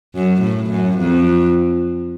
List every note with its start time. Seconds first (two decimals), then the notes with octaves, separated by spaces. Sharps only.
0.15 F#2
0.42 A2
0.71 F#2
0.98 F2